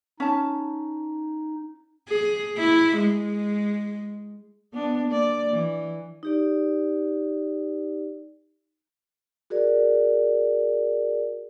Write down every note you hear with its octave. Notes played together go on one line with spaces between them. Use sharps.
C#4 D#4 A5
G#4
E4
G#3
B3 D4
A#3 D5
E3
D#4 G4 D5
F#4 G#4 A#4 D5